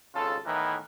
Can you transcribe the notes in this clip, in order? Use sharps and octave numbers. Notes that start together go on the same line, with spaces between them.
G#1 C#3 F4 A4
A2 D#3 E3 B3 A#4